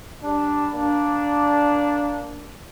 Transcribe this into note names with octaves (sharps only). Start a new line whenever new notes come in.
G3 D4
A#3 D4